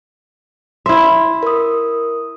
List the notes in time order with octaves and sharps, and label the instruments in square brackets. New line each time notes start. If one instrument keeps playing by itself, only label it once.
[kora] E4 E5 [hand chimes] C6
[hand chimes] A#4 D#6